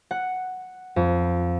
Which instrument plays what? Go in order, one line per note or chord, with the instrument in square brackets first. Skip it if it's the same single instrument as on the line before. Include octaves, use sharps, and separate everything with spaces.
[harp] F#5
F2